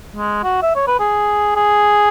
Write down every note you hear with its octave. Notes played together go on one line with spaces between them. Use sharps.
G#3
F#4
E5
C#5
B4
G#4
G#4